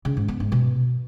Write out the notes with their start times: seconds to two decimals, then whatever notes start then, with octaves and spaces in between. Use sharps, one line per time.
0.05 C#3
0.17 G#2
0.28 B3
0.40 G#2
0.52 B2